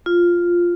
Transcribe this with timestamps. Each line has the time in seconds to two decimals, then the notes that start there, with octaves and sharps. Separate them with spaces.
0.06 F4